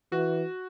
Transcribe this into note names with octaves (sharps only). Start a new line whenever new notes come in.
E3 F#4